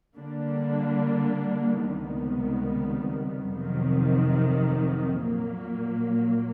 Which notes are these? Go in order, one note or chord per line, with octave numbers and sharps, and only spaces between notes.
D3 G3 A#3 D4
C#2 C3 D#3 G3 B3
F2 C3 D#3 F#3
A#2 F#3 A#3